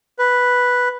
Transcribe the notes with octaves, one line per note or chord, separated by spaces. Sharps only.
B4